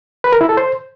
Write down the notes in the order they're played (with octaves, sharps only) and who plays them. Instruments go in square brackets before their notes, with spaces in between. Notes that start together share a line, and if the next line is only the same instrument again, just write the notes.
[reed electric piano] B4
A#4
E4
A4
C5